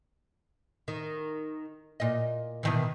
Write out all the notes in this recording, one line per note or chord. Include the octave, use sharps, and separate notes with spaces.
D#3
A#2 D#5
B2 D#3 E3